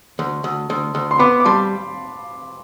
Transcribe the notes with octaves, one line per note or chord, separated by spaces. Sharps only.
D2
D2
D2
D2
C6
B3 B5 D6
D6
G3 A5 C6